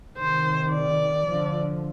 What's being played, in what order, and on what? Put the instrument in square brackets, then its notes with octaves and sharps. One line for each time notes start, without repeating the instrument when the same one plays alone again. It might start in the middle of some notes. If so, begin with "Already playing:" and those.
[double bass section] C3 D#3 [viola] C5
[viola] D5
[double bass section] D3 F3